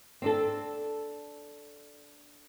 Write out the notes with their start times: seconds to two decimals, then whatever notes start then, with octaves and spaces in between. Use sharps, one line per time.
0.22 C4 D4 A4